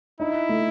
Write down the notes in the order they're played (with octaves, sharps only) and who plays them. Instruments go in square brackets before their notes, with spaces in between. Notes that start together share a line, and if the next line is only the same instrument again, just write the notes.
[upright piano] D#4 [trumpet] E4
[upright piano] A3